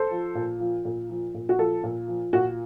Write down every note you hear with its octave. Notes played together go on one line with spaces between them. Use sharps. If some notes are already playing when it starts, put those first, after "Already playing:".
Already playing: A4 C5
F3
A#2
F3
A#2
F3
A#2
F#4
F3 A4
A#2
F3
A#2 F#4